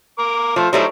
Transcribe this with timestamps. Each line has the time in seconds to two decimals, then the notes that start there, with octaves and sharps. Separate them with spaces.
0.18 A#4 D6
0.56 F3 A3
0.73 F#3 G3 A3 D#4 E4 C5